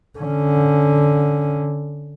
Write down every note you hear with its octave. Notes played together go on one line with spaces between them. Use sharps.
D3 C#4